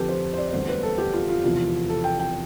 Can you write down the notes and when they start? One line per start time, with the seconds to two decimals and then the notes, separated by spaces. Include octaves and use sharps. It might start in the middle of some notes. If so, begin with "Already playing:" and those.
Already playing: F1 F2 D3 F3 G4 A4 B4
0.09 C5
0.34 C5
0.38 D5
0.48 D5
0.53 E1 D2 D3 G3 C5
0.69 B4
0.83 A4
0.98 G4
1.13 F4
1.29 F4
1.44 E1 E2 C3 F3
1.89 A4
2.04 G5
2.19 G5